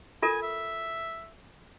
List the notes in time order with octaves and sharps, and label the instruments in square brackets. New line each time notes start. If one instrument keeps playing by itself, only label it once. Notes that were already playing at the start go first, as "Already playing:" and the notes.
[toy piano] F4 A4 A#4 [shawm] G#5
[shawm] E5